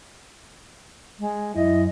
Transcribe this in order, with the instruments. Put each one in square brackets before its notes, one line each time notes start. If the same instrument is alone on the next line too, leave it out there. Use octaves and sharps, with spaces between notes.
[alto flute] G#3
[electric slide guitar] F#2 [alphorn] E4 [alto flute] D#5